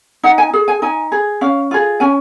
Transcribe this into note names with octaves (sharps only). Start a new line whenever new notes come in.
D#4 F#5
G#5
G#4
G#5
D#4 G#5
G#4
C#4 F5
F4 G#4
C#4 G#5